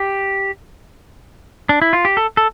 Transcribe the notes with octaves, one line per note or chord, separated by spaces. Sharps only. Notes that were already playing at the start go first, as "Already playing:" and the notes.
Already playing: G4
D4
E4
F4
G4
A4
A4